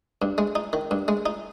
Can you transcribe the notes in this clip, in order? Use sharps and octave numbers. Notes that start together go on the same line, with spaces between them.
G2
G#3
D#4
D#3
G2
G#3
D#4